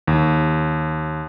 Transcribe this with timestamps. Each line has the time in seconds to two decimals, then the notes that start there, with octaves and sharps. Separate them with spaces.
0.08 D#2